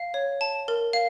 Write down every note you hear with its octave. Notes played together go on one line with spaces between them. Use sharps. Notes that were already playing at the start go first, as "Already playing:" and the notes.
Already playing: F5
C#5
A5
A#4
F5